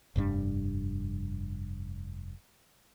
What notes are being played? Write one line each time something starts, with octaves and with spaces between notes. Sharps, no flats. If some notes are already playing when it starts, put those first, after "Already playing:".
F1 G2 G3 D4